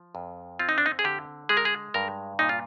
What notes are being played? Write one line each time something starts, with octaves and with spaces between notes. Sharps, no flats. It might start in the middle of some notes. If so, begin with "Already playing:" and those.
Already playing: F3
F2
C4 F4
D#4
D4
D#4
G#4
D3 G4
G#3 G#4
A#4
G#4
G2 A#4
A#2 D#4
F4